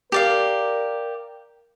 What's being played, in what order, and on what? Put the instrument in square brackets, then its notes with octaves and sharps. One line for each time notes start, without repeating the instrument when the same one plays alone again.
[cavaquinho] G4 D5 F5 [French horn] A#4